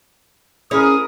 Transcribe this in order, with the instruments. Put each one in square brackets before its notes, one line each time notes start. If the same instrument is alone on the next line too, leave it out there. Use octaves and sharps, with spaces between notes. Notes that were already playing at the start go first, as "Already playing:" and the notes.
[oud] C#4 [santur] E4 A#4 [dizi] G#4 [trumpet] D#6